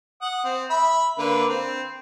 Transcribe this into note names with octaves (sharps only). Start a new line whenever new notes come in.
F#5 D#6
C4
E5 B5
D3 A#3 B4
C4